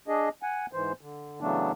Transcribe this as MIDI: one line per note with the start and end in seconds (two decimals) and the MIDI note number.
0.08 0.29 62
0.08 0.29 68
0.08 0.29 75
0.43 0.66 78
0.43 0.66 80
0.73 0.92 44
0.73 0.92 52
0.73 0.92 72
1.01 1.40 50
1.41 1.72 49
1.41 1.72 52
1.41 1.72 54
1.41 1.72 57
1.41 1.72 59
1.41 1.72 62